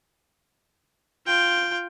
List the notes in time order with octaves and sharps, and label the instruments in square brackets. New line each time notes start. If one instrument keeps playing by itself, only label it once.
[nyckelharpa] F4 G5